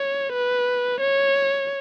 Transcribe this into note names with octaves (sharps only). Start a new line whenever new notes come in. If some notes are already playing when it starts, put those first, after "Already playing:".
Already playing: C#5
B4
C#5